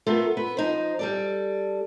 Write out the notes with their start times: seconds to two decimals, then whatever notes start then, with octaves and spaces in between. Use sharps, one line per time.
0.07 A3 B3 F4 A4 A#4
0.37 B3 B4
0.57 F3 D#4 C5
0.99 G3 A4 D5